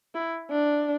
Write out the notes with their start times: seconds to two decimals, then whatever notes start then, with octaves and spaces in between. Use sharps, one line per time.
0.15 E4
0.50 D4